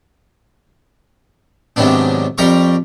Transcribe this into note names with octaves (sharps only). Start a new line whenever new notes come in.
G#2 C3 D#3 F#3 B3 D4
F2 G3 G4 A#4 A#5 C#6